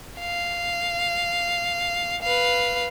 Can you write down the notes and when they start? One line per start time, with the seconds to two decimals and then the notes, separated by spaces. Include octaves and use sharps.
0.19 F5
2.22 B4 F5